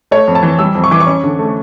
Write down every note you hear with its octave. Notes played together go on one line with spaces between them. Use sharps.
A3 C#5
F2
A5
E3
G3 E6
F2
C#6
E3 D6
C#6
C#4
D3
A3